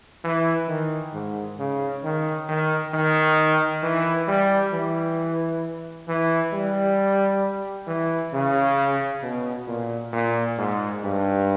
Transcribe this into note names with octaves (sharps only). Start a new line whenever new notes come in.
E3
D#3
G#2
C#3
D#3
D#3
D#3
E3
G3
E3
E3
G3
E3
C#3
B2
A#2
A#2
G#2
G2